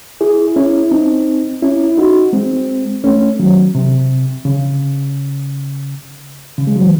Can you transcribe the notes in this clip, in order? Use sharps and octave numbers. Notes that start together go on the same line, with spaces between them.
E4 G#4
C#4 E4
C4 D#4
C#4 E4
D#4 F#4
G#3 C4
A3 C#4
D#3 F#3
C3
C#3
C#3
G#3
F#3
E3